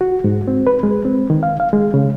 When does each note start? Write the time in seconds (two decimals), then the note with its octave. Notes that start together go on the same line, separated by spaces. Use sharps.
0.01 F#4
0.24 G#2
0.48 C4
0.67 B4
0.83 G#3
1.05 C4
1.30 D#3
1.43 F5
1.60 F5
1.73 G#3
1.94 C#3